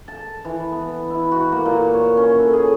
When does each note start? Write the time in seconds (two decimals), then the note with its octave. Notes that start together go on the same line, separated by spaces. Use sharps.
0.08 A5
0.45 E3
0.72 B3
1.10 E4
1.32 F#4
1.52 A#3
1.65 A#2
1.94 C#5
2.17 C#4
2.39 A4
2.53 G#4